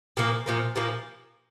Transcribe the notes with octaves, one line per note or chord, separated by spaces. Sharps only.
A#2 F3 A#3
A#2 F3 A#3
A#2 F3 A#3